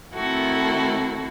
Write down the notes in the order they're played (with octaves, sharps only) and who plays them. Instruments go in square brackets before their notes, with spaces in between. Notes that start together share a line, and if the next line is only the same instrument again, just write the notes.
[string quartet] D#3 A3 C4 E4 F#4 A4